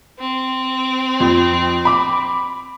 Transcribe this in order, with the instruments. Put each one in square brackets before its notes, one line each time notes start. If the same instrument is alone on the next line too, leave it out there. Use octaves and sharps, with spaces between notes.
[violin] C4
[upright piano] F2
B5 D6